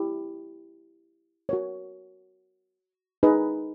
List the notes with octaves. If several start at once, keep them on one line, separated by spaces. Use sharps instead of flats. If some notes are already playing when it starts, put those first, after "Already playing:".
Already playing: E4 G4
F#4 A#4 C#5
D#4 G#4 B4 D#5